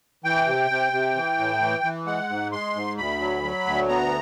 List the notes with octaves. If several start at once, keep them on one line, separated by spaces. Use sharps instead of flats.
E3 G5
C3
C3
C3
E3
A2
E3
E3
G#3 F#5
G#2
G#3 C6
G#2
D2 B5
F#3
F#3
D2
B3 A#5